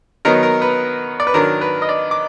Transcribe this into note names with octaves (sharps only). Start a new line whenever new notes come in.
D#3 F#3 B3 D#4 A#4
A#4
B4
D5
B4
D#3 F#3 D4 A#4
B4
D#5
D5
D6